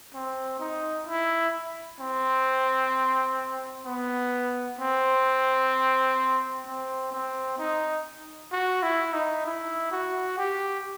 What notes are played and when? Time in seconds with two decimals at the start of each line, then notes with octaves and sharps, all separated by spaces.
0.14 C4
0.60 D#4
1.07 E4
2.00 C4
3.85 B3
4.79 C4
6.66 C4
7.12 C4
7.58 D#4
8.52 F#4
8.83 E4
9.13 D#4
9.45 E4
9.92 F#4
10.38 G4